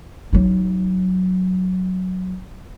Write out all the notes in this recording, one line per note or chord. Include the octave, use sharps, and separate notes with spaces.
F#3 D#4